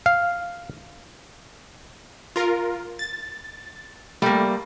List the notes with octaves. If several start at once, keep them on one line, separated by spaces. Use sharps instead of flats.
F5
F4 A#4
A6
G3 A3 A#3